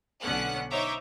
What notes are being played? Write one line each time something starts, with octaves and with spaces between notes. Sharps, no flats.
B1 D3 B3 C#4 F#5 F#6
D#4 C5 C#5 E5 A#5 D6